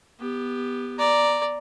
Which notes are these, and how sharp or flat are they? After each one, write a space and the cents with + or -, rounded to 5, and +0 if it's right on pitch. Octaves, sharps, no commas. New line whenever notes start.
B3 +0 G4 +15
D5 +0 A#5 +0